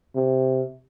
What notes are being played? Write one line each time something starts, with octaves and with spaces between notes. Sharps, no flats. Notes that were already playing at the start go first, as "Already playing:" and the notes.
C3